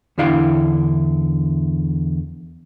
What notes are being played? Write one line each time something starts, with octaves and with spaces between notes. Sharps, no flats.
E2 D3 E4 F5 G5